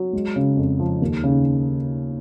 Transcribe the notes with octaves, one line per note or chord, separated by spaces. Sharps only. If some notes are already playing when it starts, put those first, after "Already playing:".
Already playing: F#3
G#3
C#3
F2
F3
D#2
C#3